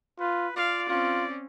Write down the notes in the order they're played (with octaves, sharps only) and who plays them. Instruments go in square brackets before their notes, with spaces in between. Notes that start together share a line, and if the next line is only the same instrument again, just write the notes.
[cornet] F4 [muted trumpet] B4
[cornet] F4 [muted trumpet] D5 [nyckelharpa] F5
[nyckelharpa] C4 C#4 [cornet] F4